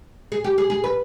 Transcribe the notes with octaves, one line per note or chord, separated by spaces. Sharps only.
G#4
G4
G#4
G#4
B4